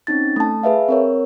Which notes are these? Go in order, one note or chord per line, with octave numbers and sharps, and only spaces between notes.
C4 C#4 D#4 A6
A3 A5
G#4 B4 E5 F5
C4 A#4 C#5